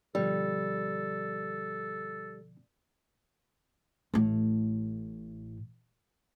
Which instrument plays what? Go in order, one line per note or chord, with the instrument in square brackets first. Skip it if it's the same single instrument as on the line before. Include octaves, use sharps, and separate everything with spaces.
[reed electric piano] B2 D3 F3 [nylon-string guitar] G3 [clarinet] A4
[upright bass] A1 A2